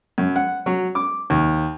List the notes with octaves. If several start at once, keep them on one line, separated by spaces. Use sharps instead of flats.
F#2
F#5
F#3
D6
D#2